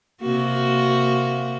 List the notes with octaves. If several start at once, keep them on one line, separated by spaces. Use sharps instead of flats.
C3 A#3 F#4